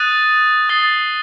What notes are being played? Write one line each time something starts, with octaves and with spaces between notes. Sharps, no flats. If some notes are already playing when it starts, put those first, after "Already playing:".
Already playing: D#6 F#6 A6 D#7
D#6 A6 C7 G7